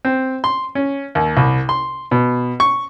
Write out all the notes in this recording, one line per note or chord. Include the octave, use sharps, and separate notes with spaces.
C4
C6
C#4
D#2
C2
C6
B2
C#6